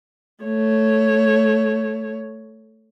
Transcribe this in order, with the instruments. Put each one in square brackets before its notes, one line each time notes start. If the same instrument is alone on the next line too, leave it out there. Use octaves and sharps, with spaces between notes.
[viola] A3 C#5